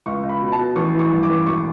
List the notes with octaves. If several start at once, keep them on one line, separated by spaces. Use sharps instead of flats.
C#2 C#6
C#2
B5
B2
A5
B2
A1 C#6
E3
C#6
G2
D6
A1
E1 C#6